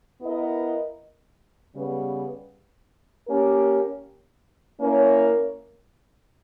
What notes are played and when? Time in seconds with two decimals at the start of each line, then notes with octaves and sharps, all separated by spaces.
0.21 B3 E4 A#4 D#5
1.74 C#3 G3 B3
3.27 A#3 C#4 G4 A#4
4.79 A#3 C#4 E4 A#4 C#5